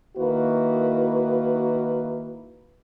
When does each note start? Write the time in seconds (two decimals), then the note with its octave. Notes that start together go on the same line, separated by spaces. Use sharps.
0.17 D#3 A#3 E4 F#4 B4